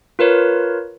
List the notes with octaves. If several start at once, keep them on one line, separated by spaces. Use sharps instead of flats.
F4 A#4 B4 C#5